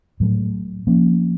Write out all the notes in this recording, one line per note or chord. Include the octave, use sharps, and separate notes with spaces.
A2 F#3 A3
F3 A#3 C#4